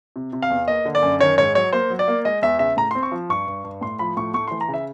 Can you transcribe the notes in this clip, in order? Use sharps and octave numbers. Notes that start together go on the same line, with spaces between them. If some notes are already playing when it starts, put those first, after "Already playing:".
C3
C3
F5
E2
A#3 D#5
D3
D5
F#2
D#3 C#5
G#2 C#5
F#3 C#5
A#3 C5
F#3
D5
A#3
G#3 D#5
E2 E5
C#3 E5
A2 A#5
C4 C6
C#6
F3
G2 C#6
G2
G2
A2 C6
F3 B5
A2 C#6
A3 C#6
E3 C6
A#5
C#3
E5